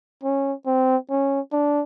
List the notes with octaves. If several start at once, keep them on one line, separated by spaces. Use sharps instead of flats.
C#4
C4
C#4
D4